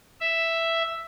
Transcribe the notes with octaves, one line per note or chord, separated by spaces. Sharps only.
E5